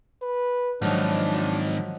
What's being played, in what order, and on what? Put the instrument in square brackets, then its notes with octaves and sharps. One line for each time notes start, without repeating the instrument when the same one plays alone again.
[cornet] B4
[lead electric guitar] G#2 D#3 [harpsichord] F3 F#3 D#4 [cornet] D4